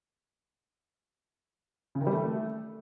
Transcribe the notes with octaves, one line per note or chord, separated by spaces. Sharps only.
C#3
D#3
G3
A3